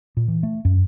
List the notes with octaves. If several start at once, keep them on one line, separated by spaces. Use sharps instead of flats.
A#2
E3
A3
F#2